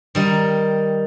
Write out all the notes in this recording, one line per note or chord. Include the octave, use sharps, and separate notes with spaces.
D#3 G3 D#4